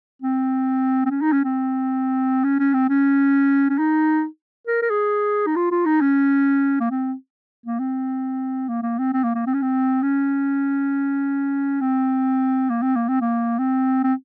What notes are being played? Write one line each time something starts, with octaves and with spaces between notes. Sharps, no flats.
C4
C4
C#4
D#4
C#4
C4
C#4
C#4
C4
C#4
C#4
D#4
A#4
A#4
G#4
D#4
F4
F4
D#4
C#4
A#3
C4
A#3
C4
A#3
A#3
C4
C4
A#3
A#3
C4
C#4
C4
C#4
C4
A#3
C4
A#3
C4
A#3
C4
C4